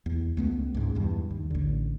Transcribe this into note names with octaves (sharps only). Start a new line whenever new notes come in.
E2
C#2 A3 B3
C#2 G#2
E2 G2
D#2
A1 D3